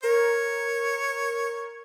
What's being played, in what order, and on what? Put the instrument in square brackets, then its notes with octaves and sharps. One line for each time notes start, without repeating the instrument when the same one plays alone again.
[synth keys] A#4 [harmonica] C#5